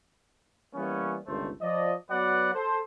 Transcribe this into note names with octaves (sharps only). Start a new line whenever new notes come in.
E3 G3 A#3 B3 C#4
G1 C#2 D#3 A3 C5
F3 D5 D#5
F#3 B3 F#4 B4 D5 F#5
A4 C5